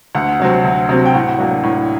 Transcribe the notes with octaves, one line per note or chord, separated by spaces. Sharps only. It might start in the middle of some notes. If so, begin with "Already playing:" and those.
D2 F#5
C3 F#3 C4
D2
C3 F#3 C4
G5
A2 F#5
F#3 A#3 D4
A2